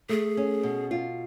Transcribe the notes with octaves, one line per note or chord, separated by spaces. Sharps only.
A3 G#4
C#4
B2
F4